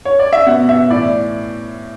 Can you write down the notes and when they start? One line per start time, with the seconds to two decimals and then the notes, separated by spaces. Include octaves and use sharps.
0.05 C#5
0.19 D5
0.33 E5
0.47 B2 F#5
0.69 E5
0.90 A2 E3 D5